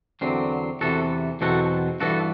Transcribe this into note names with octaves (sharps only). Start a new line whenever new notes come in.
E2 D3 F#3 C4
E2 C3 E3 F#4 A4
E2 B2 F#3 C4 F#4 A4
G2 E3 B3 F#4 A4